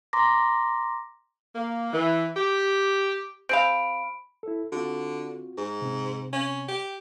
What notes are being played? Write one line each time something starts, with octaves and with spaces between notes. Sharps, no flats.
A#5 C6 D6 A#6
A#3
E3
G4
C4 G#4 F5 B5 D7
E4 A4
D3 C4 F4 F#4
G#2
C3 C4
C#4
G4